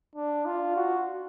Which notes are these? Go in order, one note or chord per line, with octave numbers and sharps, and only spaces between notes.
D4
F4
F#4